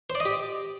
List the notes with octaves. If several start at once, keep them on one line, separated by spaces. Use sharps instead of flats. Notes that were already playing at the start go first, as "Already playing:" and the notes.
C5
D5
D#5
G4